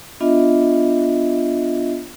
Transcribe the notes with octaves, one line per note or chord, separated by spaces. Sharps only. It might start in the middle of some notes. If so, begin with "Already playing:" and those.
B3 D4 F4 D#5 E5